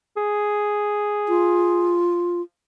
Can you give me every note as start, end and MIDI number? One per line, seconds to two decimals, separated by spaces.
0.17 2.02 68
1.28 2.41 65